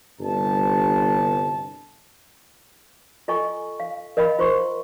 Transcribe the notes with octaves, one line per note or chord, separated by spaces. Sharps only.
G1 C2 G2 A5
F4 A4 D#5 G5 G#5 C#6
F5
A#4 D#5 F5 G5 B5
F4 C5 C6 C#6